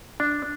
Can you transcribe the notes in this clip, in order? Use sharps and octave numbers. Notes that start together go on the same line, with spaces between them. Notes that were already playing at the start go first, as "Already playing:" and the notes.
D4